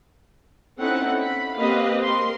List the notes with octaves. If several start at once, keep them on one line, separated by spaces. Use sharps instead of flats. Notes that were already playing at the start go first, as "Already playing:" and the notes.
C4 C#4 D#4 E4 A4 F#5
B5
A#3 C4 G4 B4 D#5 F5
A#4 C6